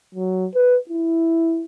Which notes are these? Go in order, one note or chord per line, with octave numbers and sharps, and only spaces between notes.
F#3
B4
E4